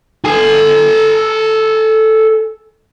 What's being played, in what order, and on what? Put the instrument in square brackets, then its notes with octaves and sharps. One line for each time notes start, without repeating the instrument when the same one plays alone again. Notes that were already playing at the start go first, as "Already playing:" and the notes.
[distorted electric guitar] A4 G#5